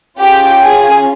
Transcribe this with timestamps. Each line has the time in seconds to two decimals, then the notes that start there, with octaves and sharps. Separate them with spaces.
0.18 C#4 F4 G4 G#4 G5
0.62 G#4 G#5